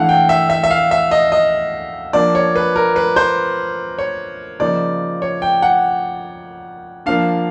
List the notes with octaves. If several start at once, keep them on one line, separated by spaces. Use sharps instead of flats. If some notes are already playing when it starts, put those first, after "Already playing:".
Already playing: E3 A3 D4 F5 F#5
G5
E5
E5
E5
F5
E5
D#5
D#5
F3 A#3 D4 D5
C#5
B4
A#4
B4
C5
C#5
C#3 F3 A#3 D#4 D5
C#5
G5
F#5
F3 A#3 D4 F5